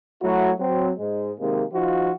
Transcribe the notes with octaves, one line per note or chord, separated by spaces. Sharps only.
F#3 A3 E4 F#4
F#3 C4
G#2 G#3
C3 D#3 G#3 A#3
F3 D#4 F4 F#4